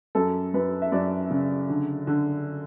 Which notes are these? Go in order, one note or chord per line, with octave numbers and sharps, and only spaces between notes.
F#2 A4
F#2 B4
E5
F#2 D5
C#3
D3
D3